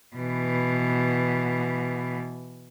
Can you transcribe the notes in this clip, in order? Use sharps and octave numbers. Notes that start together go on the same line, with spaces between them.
B2 E3